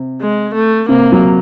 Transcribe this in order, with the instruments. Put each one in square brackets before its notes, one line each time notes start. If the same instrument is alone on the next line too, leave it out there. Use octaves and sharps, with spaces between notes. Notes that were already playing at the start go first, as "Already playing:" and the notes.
Already playing: [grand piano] C3
[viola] G#3
A3
[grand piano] C3 [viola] A#3
[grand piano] F#3